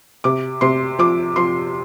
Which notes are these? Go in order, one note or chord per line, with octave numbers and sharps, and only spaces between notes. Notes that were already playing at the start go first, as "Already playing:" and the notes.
C3 D6
C3 C6
F3 D6
F3 C6